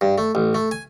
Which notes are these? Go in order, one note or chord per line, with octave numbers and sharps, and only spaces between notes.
G2
A3
A1
A3
G#5